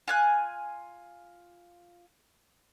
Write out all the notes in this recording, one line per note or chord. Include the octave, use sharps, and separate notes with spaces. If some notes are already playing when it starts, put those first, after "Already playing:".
F4 G#5 F#6